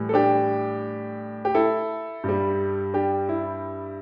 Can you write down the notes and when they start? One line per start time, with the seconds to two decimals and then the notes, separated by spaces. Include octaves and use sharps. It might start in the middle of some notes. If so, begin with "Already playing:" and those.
Already playing: A2 E3 G3
0.09 A4
0.14 D4 G4
1.45 G4
1.55 E4 A4
2.24 G2 G3
2.94 D4 G4
3.29 E4